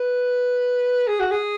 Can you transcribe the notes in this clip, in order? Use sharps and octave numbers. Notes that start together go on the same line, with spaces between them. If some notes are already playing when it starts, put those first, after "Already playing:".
Already playing: B4
G#4
F#4
G#4